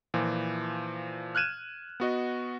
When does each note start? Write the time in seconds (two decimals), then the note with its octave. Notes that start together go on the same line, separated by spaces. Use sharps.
0.14 A#2 E3 F3
1.35 F6 F#6 G#6 D#7 E7
2.00 B3 F#4 D#5